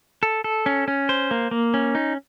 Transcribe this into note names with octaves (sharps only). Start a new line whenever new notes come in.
A4
A4
C#4
C#4
C5
A#3
A#3
C#4
D#4